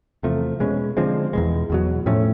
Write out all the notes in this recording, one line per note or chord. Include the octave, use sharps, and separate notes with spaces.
E2 C3 F3 A3
B2 G#3 C#4
D3 F3 G#3 C4
E2 B2 G#3
E2 B2 F#3
A2 F3 A3 C#4